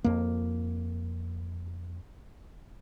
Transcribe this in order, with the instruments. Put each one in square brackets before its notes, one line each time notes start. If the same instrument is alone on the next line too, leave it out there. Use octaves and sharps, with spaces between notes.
[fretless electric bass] F2 A#3